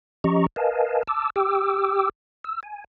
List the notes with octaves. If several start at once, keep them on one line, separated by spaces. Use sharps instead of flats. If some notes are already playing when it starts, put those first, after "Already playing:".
F3 C#4 G4 D#5 A#5 C#6
A#4 B4 D#5 F5 G#5 A5
A5 D6 E6
G4 G5 D6 E6
E6
G#5